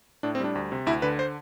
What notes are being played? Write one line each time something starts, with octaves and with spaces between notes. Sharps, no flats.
A2 D4
C4
G3 D4
D2
C3
D2 E4
D3 B4
C5